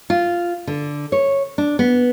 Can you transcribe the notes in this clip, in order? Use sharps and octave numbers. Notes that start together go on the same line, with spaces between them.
F4
D3
C#5
D4
B3